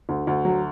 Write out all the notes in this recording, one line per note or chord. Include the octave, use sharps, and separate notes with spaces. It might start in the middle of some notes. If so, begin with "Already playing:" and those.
D2
D2
F#3